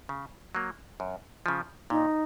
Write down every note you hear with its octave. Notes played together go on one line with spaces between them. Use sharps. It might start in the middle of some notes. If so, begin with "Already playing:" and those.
C#3
F#3 A#3
F#2
C#3 F3
A#2 D#4